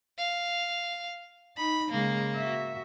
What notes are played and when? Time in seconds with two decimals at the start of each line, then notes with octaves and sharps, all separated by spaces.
0.18 F5
1.57 D#4 B5
1.92 C#3 G#3 A#3
2.35 F#4 E5